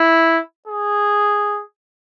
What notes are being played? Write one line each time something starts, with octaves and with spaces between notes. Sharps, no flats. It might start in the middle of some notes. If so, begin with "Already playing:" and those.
Already playing: E4
G#4